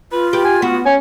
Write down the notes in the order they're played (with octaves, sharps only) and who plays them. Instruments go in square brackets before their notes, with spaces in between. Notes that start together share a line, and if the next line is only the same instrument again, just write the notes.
[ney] F4 [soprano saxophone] B4
[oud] G4 [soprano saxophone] B4
[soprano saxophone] G#5
[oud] B3 [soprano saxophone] F#4
[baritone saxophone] C#4 [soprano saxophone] G#5